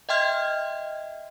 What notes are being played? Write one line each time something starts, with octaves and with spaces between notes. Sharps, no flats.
D#5 E5 G5 C6 F6 G#6